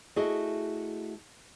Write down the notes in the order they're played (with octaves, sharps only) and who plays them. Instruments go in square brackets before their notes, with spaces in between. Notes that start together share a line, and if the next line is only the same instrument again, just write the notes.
[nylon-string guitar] A3 E4 F#4 G#4 D#5